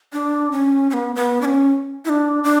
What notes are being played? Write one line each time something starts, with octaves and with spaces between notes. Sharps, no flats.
D4
C#4
C#4
B3
B3
D4
C#4
E4
D4
D4